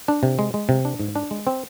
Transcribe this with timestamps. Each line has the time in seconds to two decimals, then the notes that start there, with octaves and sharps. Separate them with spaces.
0.08 D4
0.23 C3
0.39 G#3
0.54 G#3
0.69 C3
0.85 D4
1.00 G#2
1.15 D4
1.31 G#3
1.47 C4